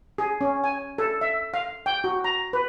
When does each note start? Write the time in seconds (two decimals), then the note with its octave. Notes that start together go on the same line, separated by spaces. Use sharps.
0.18 G#4
0.41 C#4
0.64 G#5
0.98 A4
1.21 E5
1.54 F5
1.86 G5
2.04 F#4
2.24 A#5
2.53 B4